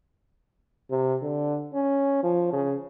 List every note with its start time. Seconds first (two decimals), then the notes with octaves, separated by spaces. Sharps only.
0.90 C3
1.22 D3
1.74 C#4
2.23 F3
2.53 C#3